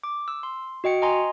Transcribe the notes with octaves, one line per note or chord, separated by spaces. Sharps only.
D6
E6
C6
F#4 D#5 G5 C#7
D#5 G#5 A#5 C6